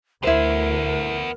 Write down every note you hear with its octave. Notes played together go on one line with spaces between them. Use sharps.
D2 B3 E4 A#4 C5 E5